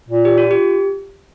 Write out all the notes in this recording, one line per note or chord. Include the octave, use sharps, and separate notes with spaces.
A#2
G4
F4
G4